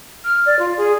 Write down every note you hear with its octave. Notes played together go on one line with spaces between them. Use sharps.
F6
D5
F4
G#4